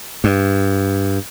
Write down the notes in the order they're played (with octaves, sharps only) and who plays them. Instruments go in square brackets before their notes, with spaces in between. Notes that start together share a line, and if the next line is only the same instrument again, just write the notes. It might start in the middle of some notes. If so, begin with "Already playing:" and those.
[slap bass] G2